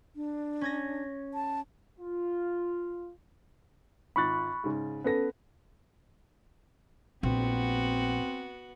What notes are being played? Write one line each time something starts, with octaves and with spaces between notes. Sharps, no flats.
D4
C#4 G#6 A#6
A5
F4
G#1 F4 B5 C#6 F#6 A6
G#2 C#3
B3 C#4 A4 B4 A#6
A#1 B3 C4 F#4